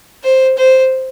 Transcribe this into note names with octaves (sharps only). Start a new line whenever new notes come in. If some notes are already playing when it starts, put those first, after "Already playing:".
C5
C5